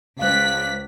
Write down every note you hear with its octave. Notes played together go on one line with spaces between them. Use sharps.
C#2 C5 D5 F5 F#6 B6